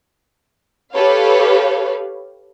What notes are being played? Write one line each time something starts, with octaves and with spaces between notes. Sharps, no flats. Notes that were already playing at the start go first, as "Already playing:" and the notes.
G4 A4 B4 C#5 F5